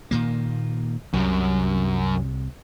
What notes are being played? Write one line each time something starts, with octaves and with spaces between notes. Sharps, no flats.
A#2 D#3 A#3
C2 F#2 C3